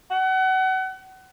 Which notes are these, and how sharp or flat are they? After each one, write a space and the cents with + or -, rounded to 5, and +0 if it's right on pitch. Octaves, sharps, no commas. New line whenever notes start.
F#5 +30